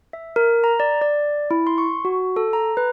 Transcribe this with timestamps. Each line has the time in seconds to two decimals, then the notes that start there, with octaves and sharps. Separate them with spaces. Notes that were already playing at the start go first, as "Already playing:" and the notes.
0.13 E5
0.36 A#4
0.64 A#5
0.80 D5
1.02 D5
1.51 E4
1.67 C6
1.78 C#6
2.05 F#4
2.36 A4
2.53 A#5
2.77 B4